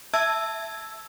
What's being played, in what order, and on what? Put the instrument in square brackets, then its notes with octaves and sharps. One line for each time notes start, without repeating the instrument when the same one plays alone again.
[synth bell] E5 A5 E6 G#6